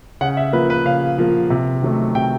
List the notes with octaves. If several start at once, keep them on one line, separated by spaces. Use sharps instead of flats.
C#3 F#5
E5
F3 A#3 B4
B4
C#3 F5
F3 A#3
C3
D#3 F#3 A3
C3 G5